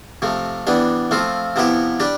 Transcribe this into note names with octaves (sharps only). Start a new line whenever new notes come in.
C3 F3 A3
E3 G3 B3 D4
F3 A3 C4 F4 A4
C3 F3 B3 E4 G4
G3 D4 G4